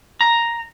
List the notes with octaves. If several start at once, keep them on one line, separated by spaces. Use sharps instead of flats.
A#5